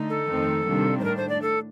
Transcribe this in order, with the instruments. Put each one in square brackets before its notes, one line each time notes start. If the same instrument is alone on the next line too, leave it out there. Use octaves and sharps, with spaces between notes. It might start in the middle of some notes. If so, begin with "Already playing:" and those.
Already playing: [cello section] D3 A3 D#4
[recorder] A4
[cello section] F2 D#3 A3 C4 D#4
C3 D#3 G3 A#3 D4
[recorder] C5
[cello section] A2 A3 D4 [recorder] A#4
[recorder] C5
D5
A4